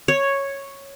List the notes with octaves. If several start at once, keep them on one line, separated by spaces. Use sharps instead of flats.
C#5